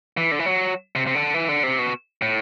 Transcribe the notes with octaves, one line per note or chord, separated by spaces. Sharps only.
E3
D3
E3
F#3
C3
C3
D3
E3
D3
C3
B2
A2